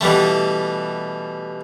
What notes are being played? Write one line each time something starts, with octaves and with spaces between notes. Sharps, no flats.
B2 E3 G3 A3